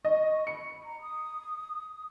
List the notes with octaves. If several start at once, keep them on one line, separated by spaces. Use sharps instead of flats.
D#5 C#6
B5 C#7
A#5
D#6